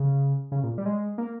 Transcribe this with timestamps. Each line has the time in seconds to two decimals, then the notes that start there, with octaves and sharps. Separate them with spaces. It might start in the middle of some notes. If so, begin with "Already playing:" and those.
Already playing: C#3
0.52 C#3
0.63 A#2
0.78 G3
0.86 G#3
1.18 A#3